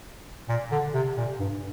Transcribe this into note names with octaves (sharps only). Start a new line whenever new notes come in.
A#2
D3
C3
A#2
G2